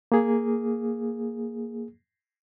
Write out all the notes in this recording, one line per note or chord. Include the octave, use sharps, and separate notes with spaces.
A#3 G#4